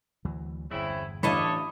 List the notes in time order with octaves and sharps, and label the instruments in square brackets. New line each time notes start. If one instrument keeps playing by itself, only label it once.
[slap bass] D2 E3 F#3
[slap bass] G1 E2 [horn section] C#3 C4 E4
[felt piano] A1 D4 F5 [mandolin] E4 D#5 D6 [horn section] A4 C#5